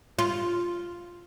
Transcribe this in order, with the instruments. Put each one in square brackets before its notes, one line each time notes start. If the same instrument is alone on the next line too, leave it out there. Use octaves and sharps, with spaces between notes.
[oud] F4